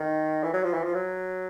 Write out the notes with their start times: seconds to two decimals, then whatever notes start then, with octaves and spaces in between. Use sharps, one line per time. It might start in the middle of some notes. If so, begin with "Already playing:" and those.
Already playing: D#3
0.43 E3
0.53 F#3
0.64 F3
0.74 E3
0.84 F3
0.94 F#3